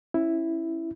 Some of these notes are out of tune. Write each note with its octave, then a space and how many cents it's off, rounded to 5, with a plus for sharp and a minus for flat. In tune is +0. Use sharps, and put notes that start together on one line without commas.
C#4 -25 E4 +0